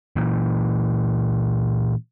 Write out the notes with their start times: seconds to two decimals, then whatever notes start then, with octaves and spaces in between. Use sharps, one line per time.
0.16 A#2 E3